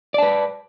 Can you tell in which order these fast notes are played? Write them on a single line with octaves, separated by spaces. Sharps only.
D5 A5 B4